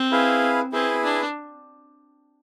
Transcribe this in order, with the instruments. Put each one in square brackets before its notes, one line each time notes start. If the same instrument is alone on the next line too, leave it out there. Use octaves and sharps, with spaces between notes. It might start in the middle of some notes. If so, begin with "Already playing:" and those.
Already playing: [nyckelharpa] C4
[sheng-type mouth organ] E4 G#4 B4 F5
[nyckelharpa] C4 [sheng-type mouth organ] E4 G#4 B4
[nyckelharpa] D4